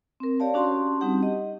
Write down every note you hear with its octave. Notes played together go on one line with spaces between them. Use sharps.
C4 A#4
G4 C#5 D5 F5 A5
C#4 D4 F#4 G4 A5 C6
G3 C4 D#4 G4 F#5
D#5